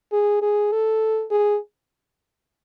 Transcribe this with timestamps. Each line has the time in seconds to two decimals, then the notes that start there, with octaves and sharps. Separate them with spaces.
0.13 G#4
0.42 G#4
0.72 A4
1.31 G#4